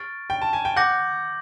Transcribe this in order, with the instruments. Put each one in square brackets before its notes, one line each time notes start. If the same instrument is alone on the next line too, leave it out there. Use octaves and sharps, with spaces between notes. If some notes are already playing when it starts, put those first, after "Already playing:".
Already playing: [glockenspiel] C#6 F6 A6 D7
[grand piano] G5
A5
G#5
G5
[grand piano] F#5 [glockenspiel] D6 G6 A#6